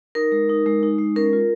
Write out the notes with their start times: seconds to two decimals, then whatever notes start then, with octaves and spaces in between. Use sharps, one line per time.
0.15 D#4 A#4
0.32 G#3
0.50 D#4
0.66 G#3
0.83 D#4
0.99 G#3
1.16 C#4 A#4
1.33 F4